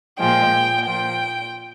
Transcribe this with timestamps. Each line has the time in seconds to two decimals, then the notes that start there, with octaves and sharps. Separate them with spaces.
0.20 A#2 F3 G#3 G5
0.86 A#2 F3 G5